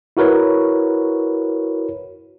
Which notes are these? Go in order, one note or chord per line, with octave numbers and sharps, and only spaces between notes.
E4 F#4 A#4 B4 C#5